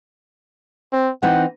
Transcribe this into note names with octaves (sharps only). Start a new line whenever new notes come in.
C4
E3 C4 D#4 F#5